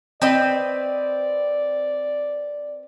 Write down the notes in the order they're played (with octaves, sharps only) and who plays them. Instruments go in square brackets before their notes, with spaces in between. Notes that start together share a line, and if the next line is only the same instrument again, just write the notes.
[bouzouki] C4 B4 D#5 [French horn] D5